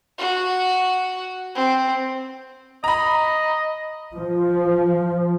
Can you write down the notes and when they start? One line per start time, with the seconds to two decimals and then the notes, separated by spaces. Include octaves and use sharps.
0.18 F#4
1.55 C4
2.84 D#5 A#5 B5
4.13 F3